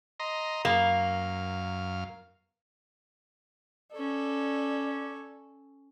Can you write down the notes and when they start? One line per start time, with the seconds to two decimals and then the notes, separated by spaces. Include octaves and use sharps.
0.20 D#5 A#5 C6
0.65 F#2 A#3 F5
3.92 C#4 A4 D5